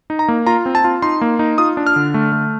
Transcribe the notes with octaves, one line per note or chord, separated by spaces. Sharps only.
D#4
A#5
A#3
F4 A#5
C4
A5
F4
D#4 C6
A#3
D#4
F4 D#6
D4
F6
D3
A3
A3